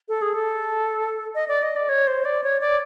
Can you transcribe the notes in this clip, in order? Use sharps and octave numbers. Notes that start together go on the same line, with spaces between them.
A4
G#4
A4
D#5
D5
D#5
D5
C#5
C5
D5
C#5
D5